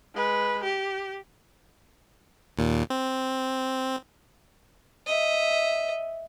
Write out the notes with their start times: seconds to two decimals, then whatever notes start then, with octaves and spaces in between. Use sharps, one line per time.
0.14 G#3 B4
0.63 G4
2.58 D#2 A#2
2.90 C4
5.07 D#5 E5